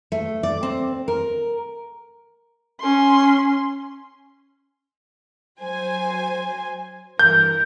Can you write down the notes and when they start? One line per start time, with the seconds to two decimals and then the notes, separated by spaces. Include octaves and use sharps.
0.12 A3
0.43 D5
0.63 C4
1.08 A#4
2.80 C#4 C6
5.61 F#3 C5 G#5
7.19 G2 E3 A#4 G6